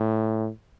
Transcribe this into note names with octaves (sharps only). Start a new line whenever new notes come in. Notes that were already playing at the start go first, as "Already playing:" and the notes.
Already playing: A2